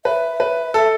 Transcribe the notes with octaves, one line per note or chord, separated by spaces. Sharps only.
B4 E5
B4
A4